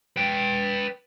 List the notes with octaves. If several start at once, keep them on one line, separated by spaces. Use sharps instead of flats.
B4 G5